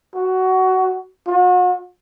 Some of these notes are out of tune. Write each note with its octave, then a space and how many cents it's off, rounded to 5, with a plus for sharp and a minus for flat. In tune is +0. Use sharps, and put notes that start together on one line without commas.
F#4 +15
F#4 -40